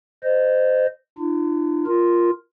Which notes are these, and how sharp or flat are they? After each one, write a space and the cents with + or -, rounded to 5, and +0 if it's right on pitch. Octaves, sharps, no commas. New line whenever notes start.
C5 -20 D#5 -20
D4 +40 F4 -40
F4 +0 A#4 +5